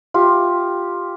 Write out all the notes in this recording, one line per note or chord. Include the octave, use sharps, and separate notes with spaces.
F4 G4